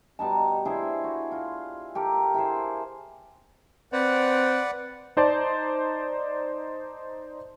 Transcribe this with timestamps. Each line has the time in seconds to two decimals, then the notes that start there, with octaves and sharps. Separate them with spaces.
0.19 B2 G3 D#4 A5
0.65 D4 E4 G#4 C5
1.04 F#4
1.32 F4
1.95 G4 A4 A#4
2.34 E4 G#4 C5
3.93 C4 B4 D5 F#5
5.17 D#4 C5 D5 A5